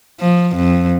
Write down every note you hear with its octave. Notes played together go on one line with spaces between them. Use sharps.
F3
F2